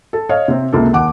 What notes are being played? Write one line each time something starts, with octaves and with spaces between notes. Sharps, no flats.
A4
C#5 D#5 F5
C3 C4
C#2 C3 A#3 A4
D#2 F#5 D6